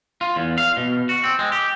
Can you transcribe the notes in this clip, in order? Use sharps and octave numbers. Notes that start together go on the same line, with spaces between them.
F4
E2
F5
B2
F#4
C4
G#3
G4